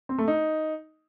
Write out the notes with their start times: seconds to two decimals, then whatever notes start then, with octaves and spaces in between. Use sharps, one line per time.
0.09 C4
0.18 A3
0.28 D#4